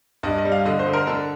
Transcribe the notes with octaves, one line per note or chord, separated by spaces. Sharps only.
G2 D#5
D#5
G3
F5
D3 D#5
C5
D3
A#4
D3 A4